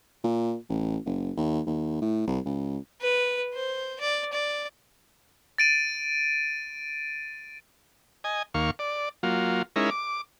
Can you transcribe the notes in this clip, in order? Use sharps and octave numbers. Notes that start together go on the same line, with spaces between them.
A#2
A1
F#1
D#2
D#2
A2
C2
C#2
B4
C5
D5
D5
A6 D7 D#7
D#5 G#5
D#2 A#3 F5 C#6
D5
F#3 A#3 F4
G#3 C#4 D#4 E4 A#4
D6